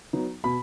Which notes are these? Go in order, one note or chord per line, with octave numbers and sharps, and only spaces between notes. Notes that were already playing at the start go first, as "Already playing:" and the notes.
F#3 B3 D#4
B2 B5